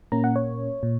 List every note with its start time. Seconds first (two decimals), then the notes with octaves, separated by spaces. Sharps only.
0.12 A#2 A#3 C#4 A#5
0.24 F#5
0.36 C#5
0.83 A#2